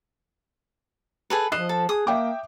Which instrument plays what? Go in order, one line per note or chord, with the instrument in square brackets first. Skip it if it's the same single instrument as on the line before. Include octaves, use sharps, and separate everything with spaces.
[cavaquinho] G#4 A4 B4
[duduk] F3 [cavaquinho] D#5 [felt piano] F#6 C7 E7
[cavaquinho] A4
[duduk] G#4 [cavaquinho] D#6
[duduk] A#3 [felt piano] E5 G5 D6